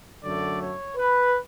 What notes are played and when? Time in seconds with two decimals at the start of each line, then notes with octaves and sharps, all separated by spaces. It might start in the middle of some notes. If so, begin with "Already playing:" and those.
0.23 F#2 D3 F#3 A3 D5
0.60 C#5
0.97 B4